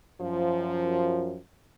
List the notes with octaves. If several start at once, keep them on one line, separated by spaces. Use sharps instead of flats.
F#2 F3